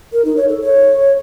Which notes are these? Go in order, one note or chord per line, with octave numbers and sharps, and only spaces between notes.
A#4
D#4
C#5
A4
C#5